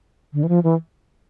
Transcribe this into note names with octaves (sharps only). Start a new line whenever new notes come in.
D3
E3
F3
E3